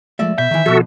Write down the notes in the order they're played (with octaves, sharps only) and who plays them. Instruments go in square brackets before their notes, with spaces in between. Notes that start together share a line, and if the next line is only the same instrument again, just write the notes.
[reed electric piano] F3 G#3 A3 [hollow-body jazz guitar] D5 E5
[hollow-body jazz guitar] B2 [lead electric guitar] E5 [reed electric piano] G6
[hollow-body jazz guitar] D#3 E3
[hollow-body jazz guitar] B2 F3 [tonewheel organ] F#4 A4